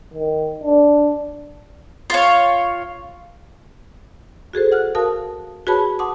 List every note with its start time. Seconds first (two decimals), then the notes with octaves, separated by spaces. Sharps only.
0.13 D#3
0.64 D4
2.10 F4 C#5
4.53 F#4 G#4 A4 C5
4.72 F#5 F6 F#6
4.95 F#4 A#4 F5 A5 D#6
5.67 F#4 G#4 B4 C#5 A5 B5
5.99 F#5 A5 C6 D6 D#6